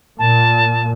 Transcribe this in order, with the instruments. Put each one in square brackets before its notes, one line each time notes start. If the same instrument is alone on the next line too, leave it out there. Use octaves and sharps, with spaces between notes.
[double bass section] A#2 [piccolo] A5